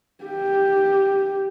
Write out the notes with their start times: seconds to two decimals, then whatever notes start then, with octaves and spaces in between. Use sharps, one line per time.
0.24 G4